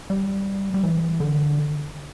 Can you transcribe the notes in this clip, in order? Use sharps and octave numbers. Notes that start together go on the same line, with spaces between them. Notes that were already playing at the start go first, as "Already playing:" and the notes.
G3
G3
E3
D3